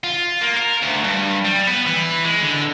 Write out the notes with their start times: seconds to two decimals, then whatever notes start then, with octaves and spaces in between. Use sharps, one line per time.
0.04 F4
0.41 A#3
0.56 A#4
0.82 D2
1.04 G2
1.45 G3
1.68 B3
1.86 E3
2.25 G#3
2.42 D3